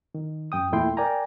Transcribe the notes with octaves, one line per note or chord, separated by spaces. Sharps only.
D#3
F#2 G5 D#6
E2 A#2 A3 E4 G5 C6
A#4 D5 G5 G#5 A#5